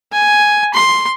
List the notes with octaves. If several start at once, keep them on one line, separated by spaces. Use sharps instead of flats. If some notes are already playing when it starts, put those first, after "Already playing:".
G#5
C6